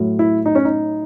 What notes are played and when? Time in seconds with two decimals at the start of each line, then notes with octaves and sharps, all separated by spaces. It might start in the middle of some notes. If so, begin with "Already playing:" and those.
Already playing: A2 F#3
0.19 E4
0.46 D#4
0.55 C#4
0.65 D#4